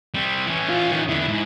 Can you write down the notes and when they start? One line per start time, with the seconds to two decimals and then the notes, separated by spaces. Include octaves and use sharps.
0.14 G3 C4
0.46 E3 C#4
0.69 F4
0.91 D#3
1.09 E2 D3 E4
1.28 G#2